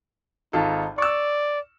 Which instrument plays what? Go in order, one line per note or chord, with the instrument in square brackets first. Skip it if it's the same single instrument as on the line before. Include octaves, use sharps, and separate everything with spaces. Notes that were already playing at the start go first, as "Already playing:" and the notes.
[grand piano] G#1 F4 A4 [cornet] D#4
[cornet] D5 [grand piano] C#6 E6